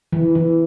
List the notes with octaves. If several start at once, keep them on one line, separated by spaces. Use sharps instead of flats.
E3
E3